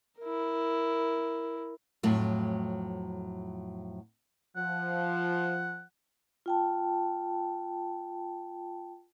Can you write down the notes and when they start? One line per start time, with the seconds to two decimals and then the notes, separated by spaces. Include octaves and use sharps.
0.20 E4 A#4
2.03 F2 A2 F#3 A3
4.57 F3 F#5
6.46 F4 G5 A5